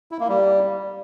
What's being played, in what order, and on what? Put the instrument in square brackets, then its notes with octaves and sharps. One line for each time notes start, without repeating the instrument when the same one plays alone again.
[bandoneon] E4
A#3
G3